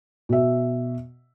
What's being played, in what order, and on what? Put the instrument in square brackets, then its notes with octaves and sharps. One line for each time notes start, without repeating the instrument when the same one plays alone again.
[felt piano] B2 E5